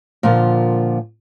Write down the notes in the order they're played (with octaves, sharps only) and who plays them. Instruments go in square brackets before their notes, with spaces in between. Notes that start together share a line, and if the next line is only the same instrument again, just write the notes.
[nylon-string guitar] A#2 D3 F3 A#3